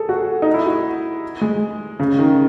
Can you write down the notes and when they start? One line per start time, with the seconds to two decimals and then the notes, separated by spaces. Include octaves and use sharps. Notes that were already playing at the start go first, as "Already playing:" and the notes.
Already playing: G#4 A4
0.09 F#4
0.42 D#4
0.54 E4
0.66 F#4
1.41 G#3
2.00 C#3
2.19 D#3